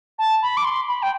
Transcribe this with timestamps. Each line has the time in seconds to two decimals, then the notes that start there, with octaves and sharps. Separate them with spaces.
0.19 A5
0.42 B5
0.57 D6
0.65 C6
0.88 B5
1.02 G5